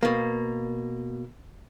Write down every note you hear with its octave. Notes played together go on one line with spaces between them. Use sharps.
B2 A#3